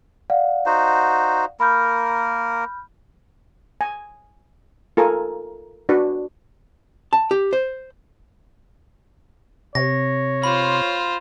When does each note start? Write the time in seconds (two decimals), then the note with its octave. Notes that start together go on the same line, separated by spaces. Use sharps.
0.30 D5 F5 F#5
0.66 D#4 F#4 C5
1.60 A#3 A#4 B5 F6 G6
3.81 G#5
4.97 F4 A4 A#4 G#5
5.89 D4 F#4 B4
7.13 A5
7.31 G4
7.53 C5
9.75 C3 C#5 A#6
10.43 F4 C5 B5